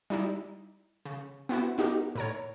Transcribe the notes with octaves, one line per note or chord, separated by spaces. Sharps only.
G3 D#4 E4
C#3
B3 C4 E4 F#4
B3 D#4 F#4 G4 A#4
A2 A#4 C#5